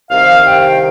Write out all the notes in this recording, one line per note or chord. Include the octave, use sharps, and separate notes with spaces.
C2 C3 D#3 F5
G5